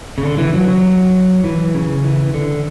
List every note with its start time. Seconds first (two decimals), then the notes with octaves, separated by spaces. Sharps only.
0.18 C#3
0.23 D3
0.38 E3
0.54 F#3
0.68 F#3
1.44 E3
1.74 C#3
2.04 E3
2.34 D3